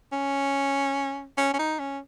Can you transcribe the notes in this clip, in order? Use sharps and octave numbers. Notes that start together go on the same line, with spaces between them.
C#4
C#4
C#4
D#4
C#4